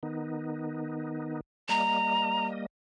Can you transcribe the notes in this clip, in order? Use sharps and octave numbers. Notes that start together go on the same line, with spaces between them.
D#3 B3 D#4
G3 A#3 D#5 A#5